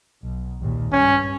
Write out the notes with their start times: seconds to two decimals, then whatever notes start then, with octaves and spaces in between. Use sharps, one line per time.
0.22 B1
0.61 G#1 D#2 A#2
0.92 G2 C#4